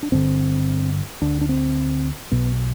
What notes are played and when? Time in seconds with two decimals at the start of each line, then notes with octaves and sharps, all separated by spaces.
0.03 D4
0.11 G1 G2 D3 C4
1.22 D2 D3 D4
1.41 D4
1.49 C4
2.31 B1 B2 B3